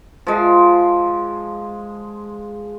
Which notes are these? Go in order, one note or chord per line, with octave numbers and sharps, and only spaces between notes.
F3 G#3